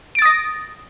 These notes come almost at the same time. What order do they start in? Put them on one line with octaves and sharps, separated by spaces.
D7 A6 D#6 A#6